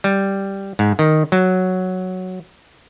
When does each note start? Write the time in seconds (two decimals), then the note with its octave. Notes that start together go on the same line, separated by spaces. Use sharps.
0.04 G3
0.79 G#2
0.99 D#3
1.32 F#3